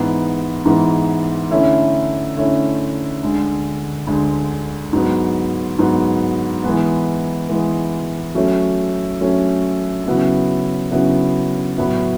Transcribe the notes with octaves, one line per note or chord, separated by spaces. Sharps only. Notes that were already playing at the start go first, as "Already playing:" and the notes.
Already playing: G#2 E3 B3
G#2 E3 B3
D3 A3 C#4 E4
D3 A3 C#4 E4
D2 D3 G#3
D2 D3 G#3
G#2 F#3 B3
G#2 F#3 B3
E3 G#3 B3
E3 G#3 B3
F#3 A3 C#4
F#3 A3 C#4
C#3 F#3 B3 E4
C#3 F#3 B3 E4
A2 F#3 B3 E4